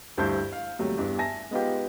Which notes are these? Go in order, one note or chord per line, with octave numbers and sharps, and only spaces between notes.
D2 G2 E4 C5 A5 G6
F5
D#2 C3 F#3 G3 A3
E2 G2 E3 D4
E5 G#5 A5 A#6
G#3 B3 D#4 F4 G4